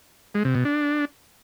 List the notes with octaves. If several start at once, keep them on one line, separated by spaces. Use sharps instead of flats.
G#3
C3
B2
D4